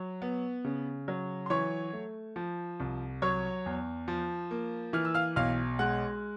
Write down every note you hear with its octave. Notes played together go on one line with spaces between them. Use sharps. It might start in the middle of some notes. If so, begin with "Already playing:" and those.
Already playing: F#3
B3
C#3
F#3
C6
E3 C#5 C#6
A3
F3
C2
F#3 C#5 C#6
E2
F3
A#3
E3 F6
E6
F5 F6
B1 F5 F6
G#3 F#5 F#6